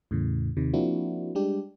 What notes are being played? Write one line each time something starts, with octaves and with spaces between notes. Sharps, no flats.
E2 A2 C#3
D#2 C3 D#3
F3 A#3 C4 D4 E4 F#4
G3 G#3 D4 G4